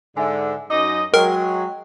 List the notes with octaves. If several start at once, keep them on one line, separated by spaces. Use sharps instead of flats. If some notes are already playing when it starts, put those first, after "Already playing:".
G#2 D3 E5 G#5
F#2 D#4 D#5 D6
F#3 G#3 A#4 G5